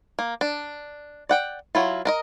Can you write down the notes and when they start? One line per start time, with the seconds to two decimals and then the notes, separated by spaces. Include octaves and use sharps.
0.19 A#3
0.41 D4
1.29 D5 F#5 G5
1.75 F#3 E4 F4
2.05 D4 A#4 D#5